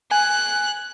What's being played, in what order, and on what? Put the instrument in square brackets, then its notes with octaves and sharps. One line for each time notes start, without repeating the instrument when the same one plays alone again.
[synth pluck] G#5 [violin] F#6